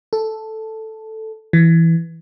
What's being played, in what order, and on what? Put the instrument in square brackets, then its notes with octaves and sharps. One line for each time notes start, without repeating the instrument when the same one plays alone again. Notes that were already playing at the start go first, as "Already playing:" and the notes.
[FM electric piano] A4
E3